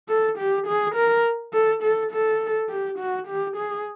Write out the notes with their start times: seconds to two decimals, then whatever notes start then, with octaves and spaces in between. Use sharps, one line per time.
0.09 A4
0.38 G4
0.67 G#4
0.95 A#4
1.53 A4
1.83 A4
2.12 A4
2.70 G4
2.99 F#4
3.27 G4
3.57 G#4